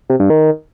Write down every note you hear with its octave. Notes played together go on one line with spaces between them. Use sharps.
C3
G2
D#3